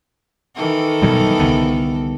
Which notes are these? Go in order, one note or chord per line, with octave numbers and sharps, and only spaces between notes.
D#3 E3 A4
B2 F#3 G3
C2 D3 B3